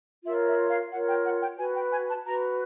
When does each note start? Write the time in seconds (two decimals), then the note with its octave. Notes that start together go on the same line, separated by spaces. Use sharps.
0.25 F4 A#4 C#5 E5
0.47 E5
0.69 F5
0.91 F4 F#5
0.94 A#4 C#5
1.08 G5
1.25 F#5
1.41 G5
1.58 F#4 B4 G#5
1.74 G5
1.91 G#5
2.08 A5
2.24 F#4 B4 A#5